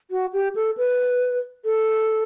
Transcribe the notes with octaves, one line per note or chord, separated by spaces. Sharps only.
F#4
G4
A4
B4
A4